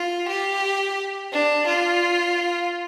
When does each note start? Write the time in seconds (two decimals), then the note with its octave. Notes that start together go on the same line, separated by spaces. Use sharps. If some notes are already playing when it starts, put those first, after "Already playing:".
Already playing: F4
0.28 G4
1.32 D4
1.67 F4